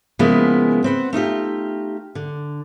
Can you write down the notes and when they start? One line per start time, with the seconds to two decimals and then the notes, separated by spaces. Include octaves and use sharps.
0.19 C#3 F3 G#3 A#3 B3 E4
0.84 C4 B4 F#5
1.13 A3 D#4 F4 G4
2.15 D3